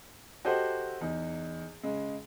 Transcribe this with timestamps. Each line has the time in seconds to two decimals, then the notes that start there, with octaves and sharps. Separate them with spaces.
0.45 F#4 G4 A4 C5 D#5 F#5
1.01 E2 D#4
1.83 C#3 G#3